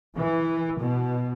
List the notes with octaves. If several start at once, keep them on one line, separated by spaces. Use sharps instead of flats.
E3
B2